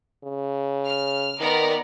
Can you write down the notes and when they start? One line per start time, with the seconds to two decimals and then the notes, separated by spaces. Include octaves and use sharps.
0.24 C#3
0.86 F6
1.40 D#3 B3 A#4 D5